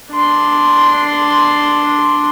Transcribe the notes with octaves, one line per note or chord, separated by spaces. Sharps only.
D4 C6